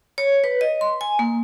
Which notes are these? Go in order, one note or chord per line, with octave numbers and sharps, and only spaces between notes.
C#5
B4
D#5
C6
G#5
A#3